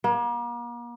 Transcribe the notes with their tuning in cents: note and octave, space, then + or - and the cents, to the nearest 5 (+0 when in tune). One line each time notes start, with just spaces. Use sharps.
A#3 +40